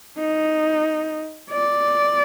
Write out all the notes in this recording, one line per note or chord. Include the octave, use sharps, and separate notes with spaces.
D#4
D5